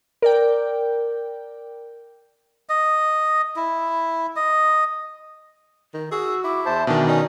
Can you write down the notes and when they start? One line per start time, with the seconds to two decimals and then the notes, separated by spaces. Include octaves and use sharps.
0.22 A#4 D5 G5
2.69 D#5
3.56 E4
4.36 D#5
5.94 D#3
6.11 F#4 G#4 E6
6.44 E4 D6
6.65 E2 C5 E5 A5
6.87 B2 D#3 E3 D4
7.08 C#4 D#4 D5